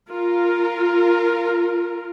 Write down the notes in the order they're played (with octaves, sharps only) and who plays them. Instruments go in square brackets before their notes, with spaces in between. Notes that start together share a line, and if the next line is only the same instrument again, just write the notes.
[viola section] F4 A#4